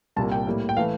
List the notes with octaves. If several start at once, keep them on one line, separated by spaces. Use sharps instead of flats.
C2 A#2 G3 A#3 A5
G5
A2 G3 A#3
G5
E3 A3 F5